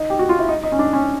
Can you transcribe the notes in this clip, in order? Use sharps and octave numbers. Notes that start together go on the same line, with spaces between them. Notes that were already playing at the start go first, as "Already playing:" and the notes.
Already playing: D#4
G4
F#4
F4
E4
D#4
D#4
C#4
D4
C#4